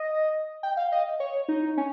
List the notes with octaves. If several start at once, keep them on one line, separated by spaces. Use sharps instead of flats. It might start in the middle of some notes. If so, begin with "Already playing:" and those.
Already playing: D#5
G5
F5
D#5
C#5
D#4
C#4